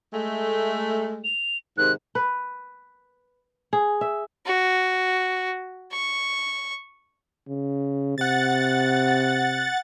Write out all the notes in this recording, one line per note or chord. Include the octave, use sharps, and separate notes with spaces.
G#3 A3
F7
G#2 C3 D#3 F#6
B4
G#4
E5
F#4
C#6
C#3
C3 F#5 A6